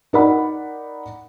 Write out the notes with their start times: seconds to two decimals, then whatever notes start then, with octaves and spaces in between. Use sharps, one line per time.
0.13 D#4 A#4 D5 F#5 B5